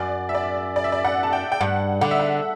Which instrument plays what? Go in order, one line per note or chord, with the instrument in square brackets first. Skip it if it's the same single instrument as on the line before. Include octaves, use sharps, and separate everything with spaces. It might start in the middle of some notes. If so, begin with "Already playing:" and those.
Already playing: [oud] F#2 [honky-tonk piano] D5
[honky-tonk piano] E5
D5
D5
E5
D5
F#5
A5
G5
G5
[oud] G2 [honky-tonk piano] F#5
[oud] D3 [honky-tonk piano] F#5
[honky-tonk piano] E5
F#5